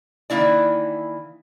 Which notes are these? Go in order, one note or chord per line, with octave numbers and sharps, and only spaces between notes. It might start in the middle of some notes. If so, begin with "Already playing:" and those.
D#3 E3 A#3 E4 D5